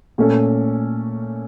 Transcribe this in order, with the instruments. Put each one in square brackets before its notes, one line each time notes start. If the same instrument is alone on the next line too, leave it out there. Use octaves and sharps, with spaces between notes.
[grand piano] A#2 A3 C#4 A4